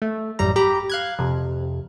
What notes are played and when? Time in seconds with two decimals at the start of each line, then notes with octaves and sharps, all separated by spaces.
0.02 A3
0.39 A1 F#2 G3 A#5
0.56 G4 A#5 B5
0.90 F5 F#6 G#6
1.19 F2 C3